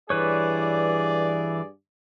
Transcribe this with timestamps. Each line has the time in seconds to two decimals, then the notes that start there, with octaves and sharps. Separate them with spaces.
0.10 G2 E3 G#4 B4 C#5 D5